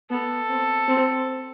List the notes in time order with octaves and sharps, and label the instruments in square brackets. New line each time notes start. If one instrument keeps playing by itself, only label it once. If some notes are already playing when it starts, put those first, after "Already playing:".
[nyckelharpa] B3 [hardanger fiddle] A4
[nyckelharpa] C4
C4